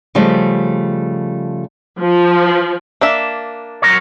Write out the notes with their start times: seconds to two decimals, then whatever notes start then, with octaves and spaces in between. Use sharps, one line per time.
0.15 C#3 F3 G3 A3 D#5
2.00 F3
3.01 A#3 D4 E5
3.82 F#3 A#4 C#5